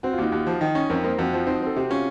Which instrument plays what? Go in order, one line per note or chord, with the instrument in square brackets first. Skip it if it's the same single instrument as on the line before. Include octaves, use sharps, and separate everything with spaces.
[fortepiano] C4 [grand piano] F#4
[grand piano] F4
[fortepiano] D#2 [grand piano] D#4
[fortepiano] D#2
F3
[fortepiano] D#3 [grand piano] D#4
[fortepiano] C#4 [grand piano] D#4
[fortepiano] F2 [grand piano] A#4
[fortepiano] A#3 [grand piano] C5
[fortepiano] F2 [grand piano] F#4
[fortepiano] F3
[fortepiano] C4 [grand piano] D#4
[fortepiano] C4 [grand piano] A4
[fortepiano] C3 [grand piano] F#4
[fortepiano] C#4 [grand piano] F4